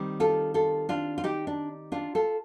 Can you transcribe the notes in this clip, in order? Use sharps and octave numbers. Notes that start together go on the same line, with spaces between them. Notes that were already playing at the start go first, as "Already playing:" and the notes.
Already playing: D#3 G3 C4
F4 A4
F4 A4
D4 F4
F4
D#4 G4
D4
D4 F4
F4 A4